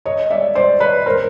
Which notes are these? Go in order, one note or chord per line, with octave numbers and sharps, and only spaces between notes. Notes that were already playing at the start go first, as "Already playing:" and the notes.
C#5 D#5
D5 E5
C5 D5
B4 C#5
A#4 C5